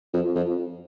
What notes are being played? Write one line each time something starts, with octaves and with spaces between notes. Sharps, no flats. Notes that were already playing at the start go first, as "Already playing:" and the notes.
F2
F2